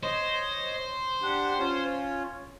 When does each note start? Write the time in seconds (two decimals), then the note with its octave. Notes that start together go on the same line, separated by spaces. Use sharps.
0.03 C5 C#5 D#5
1.22 D4 G4 F#5
1.59 C#4 F4 C#5